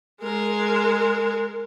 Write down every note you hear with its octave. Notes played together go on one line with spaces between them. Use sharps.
G#3 A#4